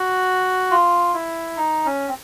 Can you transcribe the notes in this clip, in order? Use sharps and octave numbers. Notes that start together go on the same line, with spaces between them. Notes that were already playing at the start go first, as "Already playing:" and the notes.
Already playing: F#4
F4
E4
D#4
C#4
C4